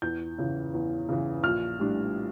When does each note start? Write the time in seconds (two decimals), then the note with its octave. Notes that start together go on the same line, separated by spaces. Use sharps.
0.02 E2 G6
0.38 C#3 E3
0.74 E2
1.09 C#3 E3
1.43 A#1 F6
1.79 A2 G3 D4